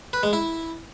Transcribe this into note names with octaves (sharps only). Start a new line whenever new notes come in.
B4
G#3
E4